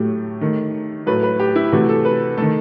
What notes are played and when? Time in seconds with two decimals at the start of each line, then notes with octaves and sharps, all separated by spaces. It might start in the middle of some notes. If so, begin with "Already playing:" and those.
Already playing: A2 F#3 A3 G4
0.41 D#3 A3
1.07 A2 F#3 A3 B4
1.23 B4
1.40 G4
1.56 E4
1.72 C3 E3 A3 F#4
1.89 A4
2.05 B4
2.37 D#3 A3 A4